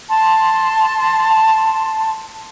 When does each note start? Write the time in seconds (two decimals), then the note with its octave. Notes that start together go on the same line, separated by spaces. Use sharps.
0.10 A5 C6